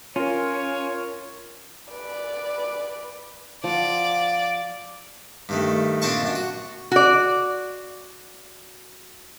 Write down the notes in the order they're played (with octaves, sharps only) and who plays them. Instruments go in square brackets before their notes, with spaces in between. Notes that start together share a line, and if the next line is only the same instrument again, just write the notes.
[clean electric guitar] C#4 [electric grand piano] F4 A#4 [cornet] C#5
[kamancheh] B4 D5
[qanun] F3 F#5 [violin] D5
[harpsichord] G2 D#3 A3
A#2 C4 D4 D#5 A5 C#6
F#2 D4
F#4
[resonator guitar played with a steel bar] F#4 D5